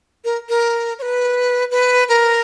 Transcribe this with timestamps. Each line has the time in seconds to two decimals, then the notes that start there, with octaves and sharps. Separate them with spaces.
0.25 A#4
0.49 A#4
0.99 C#5
1.02 B4
1.71 B4
2.09 A#4